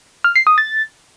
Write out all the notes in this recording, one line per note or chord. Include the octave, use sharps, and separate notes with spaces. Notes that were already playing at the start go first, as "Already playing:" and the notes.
F6
C7
D#6
A6